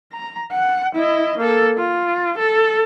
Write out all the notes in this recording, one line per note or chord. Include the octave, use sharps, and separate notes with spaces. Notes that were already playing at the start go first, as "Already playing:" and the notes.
A#5
F#5
E4 D#5
A#3 A4
F4
A4